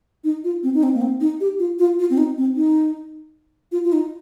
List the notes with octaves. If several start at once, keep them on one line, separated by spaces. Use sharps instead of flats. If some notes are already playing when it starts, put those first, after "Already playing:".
D#4
F4
C4
D#4
C4
A#3
C4
D#4
G4
F4
F4
F4
C4
D#4
C4
D#4
F4
F4
D#4